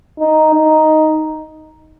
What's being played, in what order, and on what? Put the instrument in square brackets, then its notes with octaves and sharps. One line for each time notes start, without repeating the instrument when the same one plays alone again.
[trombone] D#4
D#4